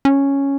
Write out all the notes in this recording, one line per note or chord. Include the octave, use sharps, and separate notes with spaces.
C#4